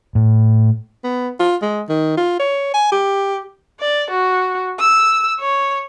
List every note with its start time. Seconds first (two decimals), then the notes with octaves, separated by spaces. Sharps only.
0.15 A2
1.04 B3
1.40 F4
1.62 G#3
1.89 D#3
2.17 F4
2.40 C#5
2.74 G#5
2.92 G4
3.80 D5
4.11 F#4
4.79 E6
5.39 C#5